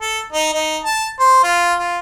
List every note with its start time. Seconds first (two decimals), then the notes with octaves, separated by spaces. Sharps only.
0.02 A4
0.32 D#4
0.53 D#4
0.84 A5
1.20 C5
1.44 F4
1.79 F4